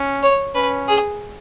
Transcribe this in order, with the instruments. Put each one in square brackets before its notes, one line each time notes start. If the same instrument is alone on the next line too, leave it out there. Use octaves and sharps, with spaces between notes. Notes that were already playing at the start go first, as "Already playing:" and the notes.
Already playing: [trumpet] C#4
[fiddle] C#5
[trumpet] C#4 [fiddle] B4
[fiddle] G#4